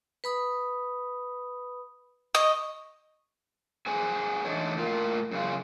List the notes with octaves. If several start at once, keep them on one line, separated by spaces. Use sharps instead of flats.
B4 B5 D#6
D#5 C#6
G#4 B4 C5 G#5
E3 A3 D4 D#4 C#5
A2 F4 A#4
F#2 C#3 F4